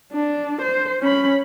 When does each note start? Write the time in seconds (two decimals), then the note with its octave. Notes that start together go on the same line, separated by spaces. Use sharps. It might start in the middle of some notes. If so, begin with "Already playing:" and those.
0.12 D4
0.61 C5
1.01 C#4 B5